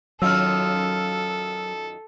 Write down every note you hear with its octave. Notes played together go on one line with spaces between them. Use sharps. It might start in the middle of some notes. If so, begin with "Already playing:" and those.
F#2 D#3 F#3 F4 A4 E6 F6